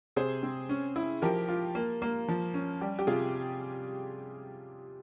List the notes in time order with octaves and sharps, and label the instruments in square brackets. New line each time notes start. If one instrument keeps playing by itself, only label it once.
[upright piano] C3 G#4 C5
C4
C#4
E4
F3 G4 A#4
F4
A#3
A#3
F3
C#4
G3 G4
G4
C3 F4 G#4